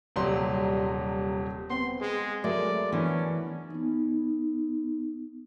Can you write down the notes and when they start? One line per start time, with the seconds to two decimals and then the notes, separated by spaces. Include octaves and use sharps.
0.16 D#1 C3 F#3 G3 C6
1.70 B3 C4 C6
2.01 G#3 G#4
2.44 F#3 G#3 A3 A#4 D5
2.92 E3 B3 C#4 D4
3.70 B3 D#4